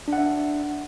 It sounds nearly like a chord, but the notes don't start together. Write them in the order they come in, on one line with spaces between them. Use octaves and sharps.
D4 F#5 E5